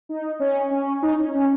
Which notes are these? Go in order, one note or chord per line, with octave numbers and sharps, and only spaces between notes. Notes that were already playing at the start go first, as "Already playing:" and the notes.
D#4
C#4
C#4
D#4
C#4
C#4